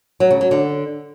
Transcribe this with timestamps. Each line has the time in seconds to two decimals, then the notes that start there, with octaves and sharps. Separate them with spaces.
0.20 F#3
0.31 C#3
0.41 F#3
0.51 D3